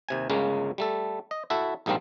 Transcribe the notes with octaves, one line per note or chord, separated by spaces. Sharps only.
D#2 C3 G#5
G1 C#2 C#3 G#3 A#3 C#4
G3 A3 A4
D#5
E4 F#4 A4 E5
A#1 G#2 G3 A#3 C4 F5